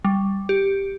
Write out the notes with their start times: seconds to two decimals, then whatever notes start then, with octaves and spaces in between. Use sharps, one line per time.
0.05 G3
0.49 G4